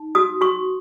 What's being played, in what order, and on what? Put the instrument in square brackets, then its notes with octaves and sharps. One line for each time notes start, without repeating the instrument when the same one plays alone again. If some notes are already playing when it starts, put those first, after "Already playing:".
Already playing: [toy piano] D#4
F#4 D#6
F#4 C#6